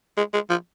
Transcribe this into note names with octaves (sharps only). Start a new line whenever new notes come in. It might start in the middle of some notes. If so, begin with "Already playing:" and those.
G#3
G#3
F3